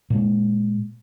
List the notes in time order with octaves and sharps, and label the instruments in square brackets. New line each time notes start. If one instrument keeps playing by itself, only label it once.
[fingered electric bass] A#2 G#3